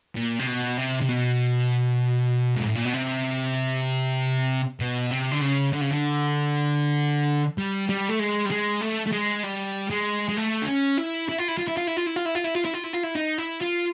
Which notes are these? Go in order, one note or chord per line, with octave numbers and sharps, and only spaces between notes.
A#2
C3
B2
C3
C3
B2
G#2
A2
A#2
B2
C3
B2
C3
D3
C#3
D3
C#3
D3
G3
G3
A3
G#3
G3
G#3
A3
A3
G#3
G3
G#3
G#3
A3
D4
C#4
E4
E4
F4
E4
F4
E4
F4
E4
F4
E4
F4
E4
F4
E4
F4
E4
F4
E4
F4
E4
D#4
E4
F4